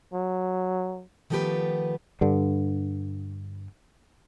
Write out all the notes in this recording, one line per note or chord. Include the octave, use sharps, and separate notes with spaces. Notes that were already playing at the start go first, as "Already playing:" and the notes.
F#3
D#3 F3 A3 B3 G4 B4
G2 D3